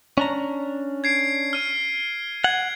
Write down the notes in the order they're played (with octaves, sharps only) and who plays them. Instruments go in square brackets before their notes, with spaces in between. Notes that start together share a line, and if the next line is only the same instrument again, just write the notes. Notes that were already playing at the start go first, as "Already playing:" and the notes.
[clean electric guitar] C#4 D4 A#5
[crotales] G#6 C7 D7
F6 D#7
[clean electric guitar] F#5 [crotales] G#6